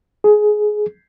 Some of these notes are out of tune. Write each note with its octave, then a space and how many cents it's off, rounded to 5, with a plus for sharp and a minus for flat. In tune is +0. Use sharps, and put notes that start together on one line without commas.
G#4 +15